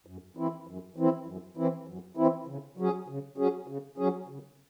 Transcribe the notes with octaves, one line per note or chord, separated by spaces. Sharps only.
F#2
E3 C4 E4
F#2
E3 C4 E4
F#2
E3 C4 E4
F#2
E3 C4 E4
C#3
F#3 C#4 G#4
C#3
F#3 C#4 G#4
C#3
F#3 C#4 G#4
C#3